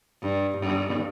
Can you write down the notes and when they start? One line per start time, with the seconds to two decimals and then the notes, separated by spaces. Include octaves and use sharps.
0.22 G2
0.57 G2